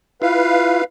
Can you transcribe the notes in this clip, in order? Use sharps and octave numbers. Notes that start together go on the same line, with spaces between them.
E4 F4 B4 F5